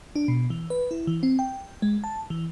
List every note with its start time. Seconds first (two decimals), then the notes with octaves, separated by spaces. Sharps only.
0.16 D4
0.28 B2
0.50 E3
0.70 B4
0.91 E4
1.07 E3
1.23 C4
1.39 G5
1.82 G#3
2.04 A5
2.30 E3